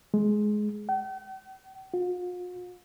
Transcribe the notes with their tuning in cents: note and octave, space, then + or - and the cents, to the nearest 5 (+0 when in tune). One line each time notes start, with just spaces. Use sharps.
G#3 +15
G5 -45
F4 +45